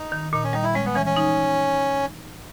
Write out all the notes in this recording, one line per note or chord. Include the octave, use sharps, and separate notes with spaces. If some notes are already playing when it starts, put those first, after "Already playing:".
Already playing: D#4
D#3
A#2 D#4
C#4
G3 D#4
E4
G#3 C#4
B3
E3 C#4
C#4
D#4